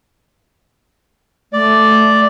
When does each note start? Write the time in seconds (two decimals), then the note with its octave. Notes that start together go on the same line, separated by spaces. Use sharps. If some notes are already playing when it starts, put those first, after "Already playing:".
1.53 A3 D5